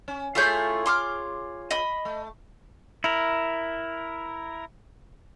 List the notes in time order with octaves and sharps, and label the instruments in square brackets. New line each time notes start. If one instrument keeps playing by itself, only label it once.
[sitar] C#4
[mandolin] A3 E4 G6 [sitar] F4 G#4 C#5
[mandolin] C6 D6 F6
D#5 B5
[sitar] A3
[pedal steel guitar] E4 A#4